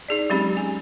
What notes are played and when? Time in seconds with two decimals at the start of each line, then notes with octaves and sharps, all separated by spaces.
0.08 D#4 G#4 D5
0.30 F#3 G#3 C4 C#4 G4 B5
0.57 G#5